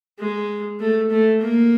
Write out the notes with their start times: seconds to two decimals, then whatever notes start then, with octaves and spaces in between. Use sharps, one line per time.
0.19 G#3
0.80 A3
1.11 A3
1.41 A#3